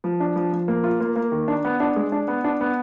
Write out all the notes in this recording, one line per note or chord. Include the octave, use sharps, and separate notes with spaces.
F3
D4
F3
F3
A#3
F4
A#3
A#3
D#3
D4
B3
D4
G#3
D4
B3
D4
B3